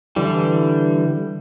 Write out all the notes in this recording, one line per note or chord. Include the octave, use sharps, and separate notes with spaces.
D3 E3 G3